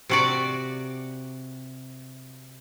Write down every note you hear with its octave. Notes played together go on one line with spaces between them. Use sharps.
C3 F#4 D5